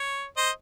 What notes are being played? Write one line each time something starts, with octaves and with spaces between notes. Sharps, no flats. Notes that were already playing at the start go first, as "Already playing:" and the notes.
Already playing: C#5
C5 D#5